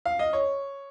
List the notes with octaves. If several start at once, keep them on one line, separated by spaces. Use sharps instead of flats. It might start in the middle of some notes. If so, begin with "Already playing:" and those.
F5
D#5
C#5